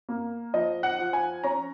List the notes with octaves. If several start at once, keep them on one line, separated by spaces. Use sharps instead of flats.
A#3
F3 D#5
F#5
F3
G#5
C#4 A#5